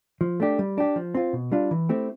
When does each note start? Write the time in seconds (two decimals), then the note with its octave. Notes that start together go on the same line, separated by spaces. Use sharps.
0.21 F3
0.40 A3 D4 G4
0.59 G3
0.78 D4 G4
0.96 F3
1.15 C4 F4
1.33 B2
1.52 G3 D4 F4
1.71 E3
1.89 A3 C4 E4 G4